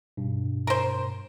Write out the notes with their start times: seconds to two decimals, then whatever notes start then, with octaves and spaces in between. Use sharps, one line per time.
0.17 G2 B2
0.67 A#4 C5